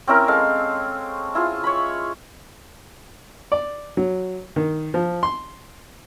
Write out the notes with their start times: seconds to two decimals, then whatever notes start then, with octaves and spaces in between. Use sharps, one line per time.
0.07 C4 C#4 E4 A#4
0.28 G#3 A4 F5
1.35 E4 F4 G#4
1.64 C#5 B5
3.52 D5
3.97 F#3
4.56 D#3
4.94 F3
5.23 C6